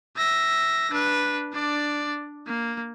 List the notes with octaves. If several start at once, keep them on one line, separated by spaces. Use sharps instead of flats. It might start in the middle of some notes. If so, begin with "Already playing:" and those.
E5 A#6
D4 B4
D4 D5
A#3